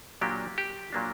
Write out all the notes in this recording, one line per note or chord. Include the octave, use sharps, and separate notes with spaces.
A#2 F#3 A#3 D4 G4
G4
A#2 F#3 A#3 D4